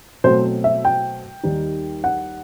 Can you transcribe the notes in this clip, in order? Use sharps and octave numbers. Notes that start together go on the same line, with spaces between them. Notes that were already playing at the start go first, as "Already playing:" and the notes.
B2 F#3 A3 C4 C5
E5
G5
D#2 D#3 G3 D#4
F#5